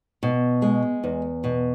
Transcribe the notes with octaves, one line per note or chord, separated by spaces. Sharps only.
B2
G#3
E2
B2